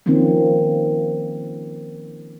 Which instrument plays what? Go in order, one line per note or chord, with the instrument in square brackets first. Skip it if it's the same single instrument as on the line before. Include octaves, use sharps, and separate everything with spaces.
[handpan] D#3 F3 A#3 C4 C#4